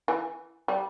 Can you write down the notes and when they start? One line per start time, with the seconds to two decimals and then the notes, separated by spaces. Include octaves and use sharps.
0.08 E3
0.68 G3